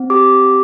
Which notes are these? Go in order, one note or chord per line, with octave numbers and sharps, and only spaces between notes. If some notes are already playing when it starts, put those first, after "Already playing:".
Already playing: C4
G4 D6